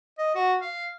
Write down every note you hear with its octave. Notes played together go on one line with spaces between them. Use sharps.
D#5
F#4
F5